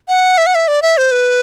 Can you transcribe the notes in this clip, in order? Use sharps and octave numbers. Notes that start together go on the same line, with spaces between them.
F#5
E5
F#5
E5
D5
E5
C5
B4